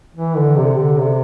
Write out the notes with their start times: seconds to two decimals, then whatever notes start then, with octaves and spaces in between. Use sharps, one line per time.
0.16 E3
0.37 D3
0.56 C3
0.77 D3
0.99 C3